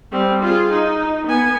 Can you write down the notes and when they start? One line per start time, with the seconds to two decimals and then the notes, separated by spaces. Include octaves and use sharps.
0.12 G3 C4
0.43 F4 G#4
0.72 D#4
1.27 B3 G#5